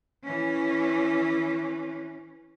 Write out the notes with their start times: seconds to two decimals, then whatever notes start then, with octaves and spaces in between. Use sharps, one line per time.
0.24 E3 C#4